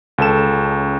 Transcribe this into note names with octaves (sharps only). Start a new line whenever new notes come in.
C#2 C#4 A4 E7